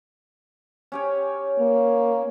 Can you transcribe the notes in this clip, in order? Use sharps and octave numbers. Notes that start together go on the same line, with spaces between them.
C#4 G4 C#5
A#3